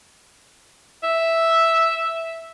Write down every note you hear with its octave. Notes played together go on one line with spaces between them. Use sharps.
E5